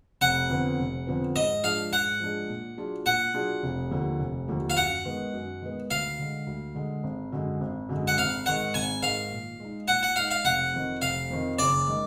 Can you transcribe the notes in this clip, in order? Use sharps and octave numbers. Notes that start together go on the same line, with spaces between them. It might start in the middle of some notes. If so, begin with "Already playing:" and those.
F1 F#5
F2 D3 F3 B3
F1
F2 D3 F3 B3
G#2 D#5
F3 G#3 D4 G#4 F5
G#2 F#5
F3 G#3 D4 G#4
A#2
F#3 D4 F4 G#4
A#2 F#5
F#3 D4 F4 G#4
F1
D#2 D3 F3
F1
D#2 D3 F3
F5
F#2 F#5
D#3 G#3 B3
F#2
D#3 G#3 B3
D2 F5
D3 G#3
D2
D3 G#3
G#1
F#2 D3 G#3
G#1
F#2 D3 G#3
F#5
G#1 F5
G#2 D#3 G#3 F#5
G#1 G#5
G#2 D#3 G#3 F5
A#2
G#3 D#4
A#2 F#5
F#5
G#3 D#4 F5
F5
F1 F#5
F2 D#3
F1 F5
F2 D#3
F#1 D5
D#3 G#3